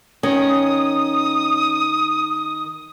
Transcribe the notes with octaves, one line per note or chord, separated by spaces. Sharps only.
D#3 C#4 D#6